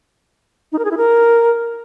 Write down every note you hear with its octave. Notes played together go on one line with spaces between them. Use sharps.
D#4
A#4
G#4
E4
A#4